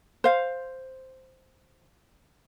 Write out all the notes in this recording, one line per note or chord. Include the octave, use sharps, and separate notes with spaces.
C5 F5